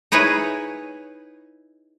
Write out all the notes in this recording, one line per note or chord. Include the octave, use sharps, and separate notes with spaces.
D#4 E4 G#4 B4 C#5